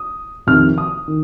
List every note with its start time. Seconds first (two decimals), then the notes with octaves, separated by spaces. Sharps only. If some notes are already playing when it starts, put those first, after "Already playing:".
Already playing: D#6
0.47 F2 C3 D#3 F6
0.78 D#6
1.08 D#3